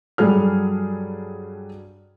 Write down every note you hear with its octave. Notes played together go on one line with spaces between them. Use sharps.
G2 F#3 G3 G#4 A4 F6